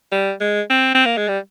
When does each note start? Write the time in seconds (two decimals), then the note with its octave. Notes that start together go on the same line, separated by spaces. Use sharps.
0.12 G3
0.41 G#3
0.70 C4
0.95 C4
1.06 A#3
1.18 G#3
1.28 G3